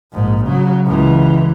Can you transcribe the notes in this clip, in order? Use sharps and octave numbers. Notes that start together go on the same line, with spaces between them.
A#1 G#2
C#3 F#3
C#2 E3